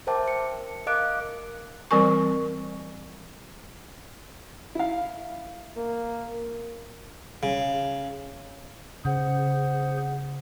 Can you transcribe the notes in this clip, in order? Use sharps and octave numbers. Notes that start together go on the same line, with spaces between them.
A#4 C5 E5 G5 A5 D6
C#7
A#4 D#5 F5 D6 F#6 D7
E3 G3 C4 A#4 G#5 C#6
E4 F5
A#3
C#3
C#3 G#4 C5 F#5